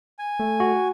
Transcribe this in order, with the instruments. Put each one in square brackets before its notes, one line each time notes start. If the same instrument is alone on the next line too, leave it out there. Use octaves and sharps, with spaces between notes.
[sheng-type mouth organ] G#5
[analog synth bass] A3
[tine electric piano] F#4